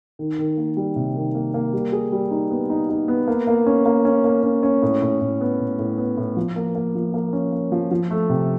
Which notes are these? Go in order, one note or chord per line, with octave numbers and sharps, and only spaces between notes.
D#3
D#3
A#3
G3
C3
D#3
A#3
A#3
G3
G#4
G3
D#4
B3
D#4
D#4
B3
A#3
A#3
C#4
A#3
C#4
A#3
C#4
C#4
A2
A2
A2
B3
A2
A2
B3
A2
F3
A#3
A#3
F3
A#3
C#4
A#3
F3
F3
A3
C3